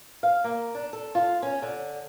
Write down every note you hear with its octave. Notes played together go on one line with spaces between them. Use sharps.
F5
A#3
D4
A4
F4
C#4
D3